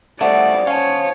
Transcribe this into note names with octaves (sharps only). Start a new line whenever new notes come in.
C#3 G3 A3 C5 D5 F#5
C#4 C#5 F5 A5